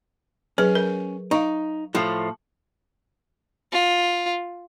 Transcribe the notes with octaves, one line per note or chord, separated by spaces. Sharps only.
F#3 C#4 G#4 B4
A#4
D#4 F5 C#6
A2 F3 A3
F4